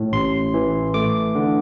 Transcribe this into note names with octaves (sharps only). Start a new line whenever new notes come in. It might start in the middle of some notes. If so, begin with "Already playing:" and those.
Already playing: A2
A1 C6
E3
A3 D6
D3